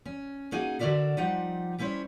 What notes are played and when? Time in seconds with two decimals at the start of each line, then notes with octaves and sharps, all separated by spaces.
0.05 C#4
0.52 A#3 C#4 D#4 F#4 G#4 D#5
0.79 D3 F#4 A#4 D5 E5
1.17 F3 G3 D#4 G4 F#5
1.78 G3 C#4 E4 C5 C#5